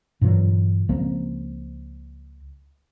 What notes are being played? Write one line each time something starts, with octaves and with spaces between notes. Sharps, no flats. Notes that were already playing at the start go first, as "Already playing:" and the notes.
G2 A#2 E3 F#3
C#2 F3 A#3 C4